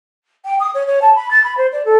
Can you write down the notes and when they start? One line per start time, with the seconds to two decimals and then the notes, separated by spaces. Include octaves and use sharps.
0.45 G5
0.60 D#6
0.75 C#5
0.87 C#5
1.02 A5
1.15 B5
1.31 A6
1.44 B5
1.57 C5
1.72 D5
1.85 A4